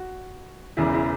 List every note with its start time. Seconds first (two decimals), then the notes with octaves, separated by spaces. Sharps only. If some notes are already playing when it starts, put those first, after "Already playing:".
Already playing: F#4
0.77 E1 E2 C#3 E3 E4
0.94 E4